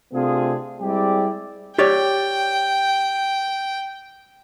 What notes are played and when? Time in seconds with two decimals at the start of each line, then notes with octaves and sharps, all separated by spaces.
0.13 C3 A3 C4 D4 F4 G#4
0.81 G3 G#3 C4 E4 G4 D5
1.78 G4 C#5 D5 G5